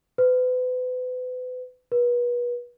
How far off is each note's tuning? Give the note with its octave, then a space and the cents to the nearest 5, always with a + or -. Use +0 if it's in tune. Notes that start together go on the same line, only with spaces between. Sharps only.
B4 +35
B4 -30